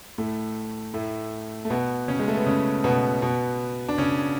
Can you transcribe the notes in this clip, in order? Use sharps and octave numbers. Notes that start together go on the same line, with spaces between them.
A2 A3
A2 A3
A3
B2 B3
C#3 C#4
G#3
A3
B3
C#3 C#4
B2 B3
B2 B3
D4
C#3 C#4